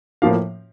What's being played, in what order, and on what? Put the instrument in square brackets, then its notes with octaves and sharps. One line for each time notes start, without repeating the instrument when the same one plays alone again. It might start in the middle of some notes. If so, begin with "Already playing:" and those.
[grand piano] A2 F3 A#3 F5